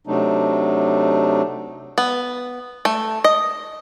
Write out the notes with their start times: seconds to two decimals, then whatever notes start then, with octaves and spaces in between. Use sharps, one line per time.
0.07 C3 F#3 A3 D4 D#4
1.98 B3
2.85 A3
3.24 D#5